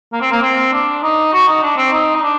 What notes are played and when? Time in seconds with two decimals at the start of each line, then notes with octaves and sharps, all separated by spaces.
0.13 A#3
0.22 C4
0.32 A#3
0.43 C4
0.72 D4
1.03 D#4
1.33 F#4
1.48 D#4
1.63 D4
1.77 C4
1.93 D#4
2.16 D#4
2.22 D4